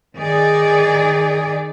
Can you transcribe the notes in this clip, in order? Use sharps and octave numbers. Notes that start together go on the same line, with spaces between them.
D#3 D#4 G#4 D5